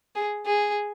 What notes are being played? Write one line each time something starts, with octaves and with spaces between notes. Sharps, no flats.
G#4
G#4